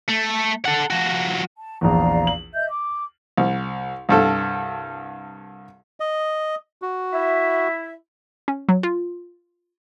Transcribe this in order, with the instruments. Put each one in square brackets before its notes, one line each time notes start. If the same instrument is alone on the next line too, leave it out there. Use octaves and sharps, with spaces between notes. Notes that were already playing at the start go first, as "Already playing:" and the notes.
[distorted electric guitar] A3
A4 F#5
F3 F#4
[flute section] A5
[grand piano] A#1 E2 [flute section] D5 F5 A#5
[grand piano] F#7
[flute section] D#5 E5 G6
D6
[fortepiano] C2
C2 G2 A4
[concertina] D#5
F#4
[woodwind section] E4 E5
[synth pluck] C#4
F#3
F4